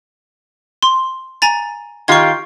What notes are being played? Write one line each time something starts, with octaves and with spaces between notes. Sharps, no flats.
C6
G#5 A#5 A6
D#3 F4 G4 C#6 G#6